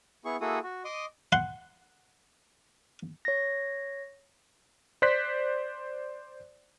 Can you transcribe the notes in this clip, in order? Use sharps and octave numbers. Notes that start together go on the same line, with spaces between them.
B3 E4 G#4 C#6
A#3 E4 F#4 G#4 A4 D#6
F#4
D#5 C6 D6 D#6
F#5 C6
C#5 A#6
C5 D5 C6 F#6 B6